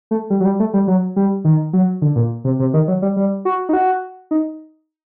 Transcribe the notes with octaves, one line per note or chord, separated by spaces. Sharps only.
A3
G3
F#3
G3
A3
G3
F#3
G3
D#3
F#3
D3
A#2
C3
C3
D#3
F#3
G3
G3
F#4
D#4
F#4
D#4